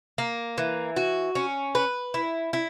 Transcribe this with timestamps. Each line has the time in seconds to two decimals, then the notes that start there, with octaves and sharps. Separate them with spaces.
0.18 A#3
0.58 E3
0.96 F#4
1.35 C#4
1.75 B4
2.14 E4
2.53 E4